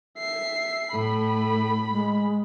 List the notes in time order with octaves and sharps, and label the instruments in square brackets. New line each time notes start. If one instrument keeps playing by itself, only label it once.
[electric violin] E5 C7
[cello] A2 [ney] A4 [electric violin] B5
[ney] G#3